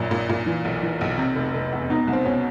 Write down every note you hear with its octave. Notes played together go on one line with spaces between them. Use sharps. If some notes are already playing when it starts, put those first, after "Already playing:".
Already playing: A#1 F#2 A#2
A#2
A#2
E3
B1
E3
B1
C3
F1
F1
E2
B2 D#4
C2
C4
B2 C#4